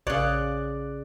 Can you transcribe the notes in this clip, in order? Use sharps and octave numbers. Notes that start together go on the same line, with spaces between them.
A#1 C#3 C#5 D5 F#6